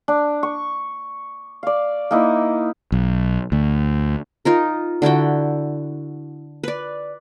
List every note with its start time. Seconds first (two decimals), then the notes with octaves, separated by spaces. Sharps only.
0.08 D4
0.43 C#6
1.63 D5 F5
2.11 A#3 D#4 E4
2.92 B1
3.52 D2
4.45 D#4 F4 A#4
5.02 D3 E4 F#4 G5
6.63 B4 D5